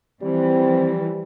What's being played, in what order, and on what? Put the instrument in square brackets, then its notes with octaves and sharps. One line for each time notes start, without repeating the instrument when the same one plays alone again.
[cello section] E3 F3 [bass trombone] G3 [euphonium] C4